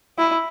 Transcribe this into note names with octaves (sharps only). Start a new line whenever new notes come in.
E4